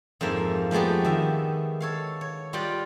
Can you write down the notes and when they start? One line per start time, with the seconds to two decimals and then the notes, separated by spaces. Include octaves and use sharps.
0.21 F2 G#2 A#3 E5
0.71 F3 G#3 A3 B3 G4
1.05 D#3 E5
1.80 A4 C#5 F5
2.21 C#5
2.53 G3 F4 G4 D5 D#5 F#5